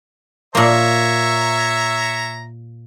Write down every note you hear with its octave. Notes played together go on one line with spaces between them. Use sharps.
A#2 A#3 C#5 E5 A#5